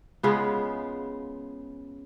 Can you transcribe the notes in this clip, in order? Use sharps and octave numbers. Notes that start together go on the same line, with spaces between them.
C#3 G#3 B3 F4